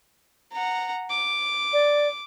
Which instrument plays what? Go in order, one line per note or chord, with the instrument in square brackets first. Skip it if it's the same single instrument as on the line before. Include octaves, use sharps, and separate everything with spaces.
[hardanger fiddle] F#5 A#5
D6
[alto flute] D5